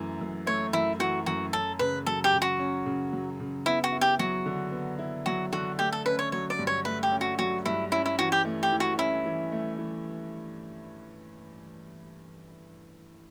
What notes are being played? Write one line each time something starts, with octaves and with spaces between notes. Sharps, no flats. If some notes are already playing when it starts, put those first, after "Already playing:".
Already playing: F#2 E3 A3
F#2
A3 C#5
F#2 E4
E3 F#4
F#2 F#4
C#4 A4
C#3 B4
F#3 A4
G4
C#3
F#4
C#4
C#3
F#3
C#3
B3 E4
F#4
E4
G4
F#3 F#4
D3
B3
E4
F#3 F#4
D3 F#4
A3 G4
A4
C#4 B4
C#5
F#3 C#5
D5
G2
C#5
A3 B4
G4
C#4
F#4
F#3 F#4
G2 E4
C#4 E4
E4
E3 F#4
G4
A3
G4
E3
F#4
C#4 E4
E3
A3
E3